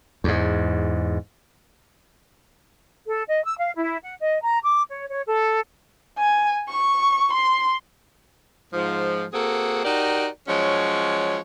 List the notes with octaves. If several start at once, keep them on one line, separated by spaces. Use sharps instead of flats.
E2 G#2
A4
D#5
E6
F5
E4
F#5
D#5
A#5
D6
C#5
C#5
A4
G#5
C#6
C6
G#2 F3
A#3 C4 F#4 G#4 A4
D#4 F#4 G4 A#4 D5
F3 F#3 G#3 C#4 C#5